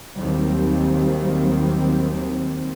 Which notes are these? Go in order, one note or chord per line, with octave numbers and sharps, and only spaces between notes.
D#2 D#3 F#3 G3 C4